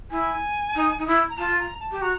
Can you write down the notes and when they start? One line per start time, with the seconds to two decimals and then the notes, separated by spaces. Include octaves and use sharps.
0.11 E4 G#5
0.75 D#4
0.99 D#4
1.07 E4
1.30 A#5
1.38 F4 A5
1.60 A#5
1.80 A5
1.91 G4
2.02 F#4 A#5